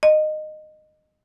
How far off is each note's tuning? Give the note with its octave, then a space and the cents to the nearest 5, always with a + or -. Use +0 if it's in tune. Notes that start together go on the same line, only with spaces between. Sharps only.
D#5 -15